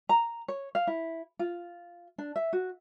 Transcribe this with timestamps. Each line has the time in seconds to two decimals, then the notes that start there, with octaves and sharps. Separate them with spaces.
0.09 A#5
0.48 C#5
0.75 F5
0.87 E4
1.39 F4
2.18 D4
2.36 E5
2.53 F#4